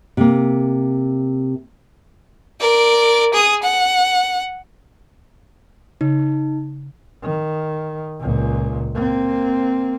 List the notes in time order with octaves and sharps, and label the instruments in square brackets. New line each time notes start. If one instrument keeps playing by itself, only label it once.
[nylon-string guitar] C3 A#3
[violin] A#4 D5
G#4 D#6
F#5
[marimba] C#3 [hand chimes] D#4
[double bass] D#3
C#2 A#2
A#3 C4